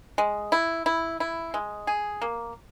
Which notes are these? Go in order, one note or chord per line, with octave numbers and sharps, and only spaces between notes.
G#3
E4
E4
E4
G#3
G#4
A#3